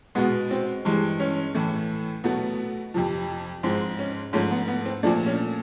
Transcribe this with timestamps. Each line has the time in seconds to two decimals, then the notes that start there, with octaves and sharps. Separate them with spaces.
0.15 B2 G#3 B3
0.51 C4
0.85 G2 E3 G#3
1.20 C#4
1.55 A2 E3 A3
2.24 B2 F#3 A3 B3
2.94 F2 C3 F3
3.63 G#2 F3 G#3 C4
3.99 C#4
4.33 G#2 F3 A3 C#4
4.51 B3
4.68 B3
4.86 C4
5.03 A#2 F3 A3 D4
5.26 C#4